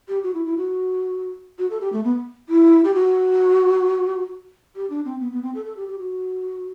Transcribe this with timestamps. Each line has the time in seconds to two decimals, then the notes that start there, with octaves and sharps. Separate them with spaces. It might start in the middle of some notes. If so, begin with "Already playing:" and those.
0.08 G4
0.23 F#4
0.34 E4
0.46 E4
0.58 F#4
1.59 F#4
1.70 A4
1.81 G4
1.93 A3
2.04 B3
2.49 E4
2.84 G4
2.94 F#4
4.76 G4
4.90 D4
5.05 C4
5.20 B3
5.32 B3
5.43 C4
5.55 A4
5.65 A4
5.77 G4
5.88 G4
5.99 F#4